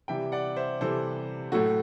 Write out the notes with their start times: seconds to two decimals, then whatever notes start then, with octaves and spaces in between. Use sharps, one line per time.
0.08 C3 E3 G3 E5 G5
0.32 D5 F#5
0.56 C5 E5
0.81 C3 E3 G3 A4 C5
1.52 A2 F#3 A3 F#4 A4